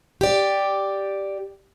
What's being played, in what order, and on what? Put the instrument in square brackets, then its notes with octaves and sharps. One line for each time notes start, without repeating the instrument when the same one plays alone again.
[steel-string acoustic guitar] G4 D5